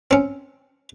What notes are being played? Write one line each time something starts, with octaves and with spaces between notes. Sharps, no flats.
C4 C#4